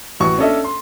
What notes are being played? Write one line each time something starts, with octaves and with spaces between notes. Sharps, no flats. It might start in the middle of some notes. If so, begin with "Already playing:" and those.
A1 F#4 C#6
C#4 D4 A4 D#5 E5
C6